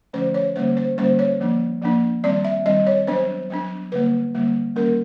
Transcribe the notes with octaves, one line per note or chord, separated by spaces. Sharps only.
D3 F3 A3 C#4 C5
C#5
D3 G3 A#3 C#4 C5
C5
D3 G3 A#3 C#4 C5
C#5
F3 A#3 D4
F3 A#3 D4
D#3 G3 C4 D5
E5
D#3 G3 C4 D#5
C#5
F#3 B3 D4 C5
F#3 B3 D4
D3 G3 A#3 B4
D3 G3 A#3
D#3 G3 A#3 C#4 A#4